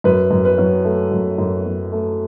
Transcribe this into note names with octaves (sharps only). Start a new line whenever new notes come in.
F#2 B4
F#2
B4
F#3
A3
F#2
F#2
F#3
A3